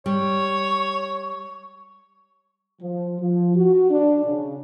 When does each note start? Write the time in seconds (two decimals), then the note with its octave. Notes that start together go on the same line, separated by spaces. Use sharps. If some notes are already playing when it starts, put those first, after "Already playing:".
0.06 G3 C#5 C#6
2.81 F3
3.19 F3
3.55 F#4
3.90 D4
4.25 C#3